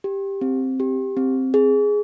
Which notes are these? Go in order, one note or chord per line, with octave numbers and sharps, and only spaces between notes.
G4
C4
G4
C4
G#4